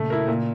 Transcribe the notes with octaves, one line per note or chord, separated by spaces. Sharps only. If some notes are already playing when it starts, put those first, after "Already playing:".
Already playing: A#2 C#3 A3
E4 A#4
A#2